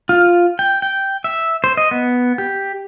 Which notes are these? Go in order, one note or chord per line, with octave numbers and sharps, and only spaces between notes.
F4
G5
G5
E5
C5
D#5
B3
G4